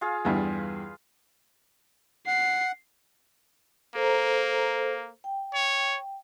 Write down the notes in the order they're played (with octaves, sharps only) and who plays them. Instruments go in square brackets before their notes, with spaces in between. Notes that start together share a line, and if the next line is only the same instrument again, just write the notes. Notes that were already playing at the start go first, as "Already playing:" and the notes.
[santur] F4 G#4 F5
[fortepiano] E2 G2 E3 [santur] B4 F5 B5
[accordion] F#5 [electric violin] C7
[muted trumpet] A#3 [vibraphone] A4 C5 A#5
[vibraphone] G5
[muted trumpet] C#5